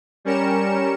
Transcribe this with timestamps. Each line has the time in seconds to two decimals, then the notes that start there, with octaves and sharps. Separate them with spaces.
0.25 G3 C#4 A#4 C#7 E7